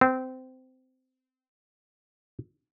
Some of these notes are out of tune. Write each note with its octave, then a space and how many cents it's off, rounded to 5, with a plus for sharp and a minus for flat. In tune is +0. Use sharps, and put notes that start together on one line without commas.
C4 -20